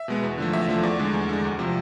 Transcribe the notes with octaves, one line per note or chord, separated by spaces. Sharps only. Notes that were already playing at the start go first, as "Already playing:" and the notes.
Already playing: E5
B2 G#3 B3
E2
D3 F3 A3
E2 E5
D3 F3 A3
E2 D5
D3 G#3
E2
D3 G#3
D2
C3 F3